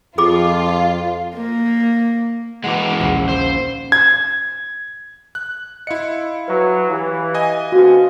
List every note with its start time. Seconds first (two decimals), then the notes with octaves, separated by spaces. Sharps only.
0.18 F2 F4 G#4 B5 D6
1.35 A#3
2.64 E3 G#3 F#5 C#6 D6
2.89 C#4 D6
3.00 A#1 D#2
3.29 C5
3.92 G#6
5.35 F#6
5.87 E4 D#5 F5 C6 C#7
6.48 F#3 B4
6.90 E3 G4 F5
7.34 D#5 G#5
7.72 D2 B3 C4 F#4 F5